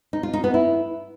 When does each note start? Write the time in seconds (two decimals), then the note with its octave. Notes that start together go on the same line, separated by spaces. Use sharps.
0.13 D#4
0.23 F4
0.33 D#4
0.44 B3
0.54 E4